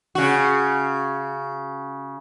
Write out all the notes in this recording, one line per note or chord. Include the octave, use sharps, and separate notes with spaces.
C#3 F#4